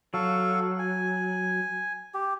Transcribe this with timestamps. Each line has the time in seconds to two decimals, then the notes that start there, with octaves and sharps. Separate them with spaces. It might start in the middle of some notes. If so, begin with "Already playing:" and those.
0.14 F#3 A4 F5 C#6
0.79 G#5
2.14 G4